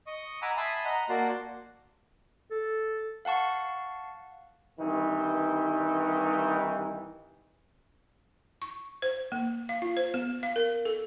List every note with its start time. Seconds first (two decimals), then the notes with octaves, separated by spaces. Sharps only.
0.07 D#5 C#6 D#6
0.42 F#5 G#5 A#5 B5 D6 E6
0.57 E5 G#5 A5 B5 C6 D#6
0.85 D#5 F#5 A#5
1.09 A#3 F#4 D5 F#5 A5 C6
2.51 A4
3.25 F5 F#5 A5 C#6
4.79 C2 G2 D#3 E3 D#4
8.62 C#6
9.02 C5
9.32 A#3
9.69 F5
9.82 F4
9.97 C5
10.14 B3
10.43 F5
10.56 A#4
10.85 A4